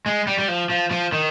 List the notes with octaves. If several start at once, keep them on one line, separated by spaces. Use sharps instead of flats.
G#3
G3
G3
F3
F3
F3
D#3